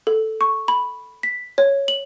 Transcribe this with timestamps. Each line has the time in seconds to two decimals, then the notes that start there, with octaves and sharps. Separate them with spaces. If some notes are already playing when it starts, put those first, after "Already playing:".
0.07 A4
0.41 C#6
0.68 B5
1.23 B6
1.58 C#5
1.88 F#7